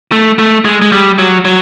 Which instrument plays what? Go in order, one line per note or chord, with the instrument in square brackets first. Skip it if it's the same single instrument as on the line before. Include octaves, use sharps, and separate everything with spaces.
[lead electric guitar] A3
A3
G#3
G#3
G3
F#3
F#3